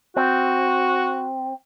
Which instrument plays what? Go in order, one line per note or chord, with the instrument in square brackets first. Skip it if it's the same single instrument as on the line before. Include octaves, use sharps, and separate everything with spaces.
[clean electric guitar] C4 [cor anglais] F#4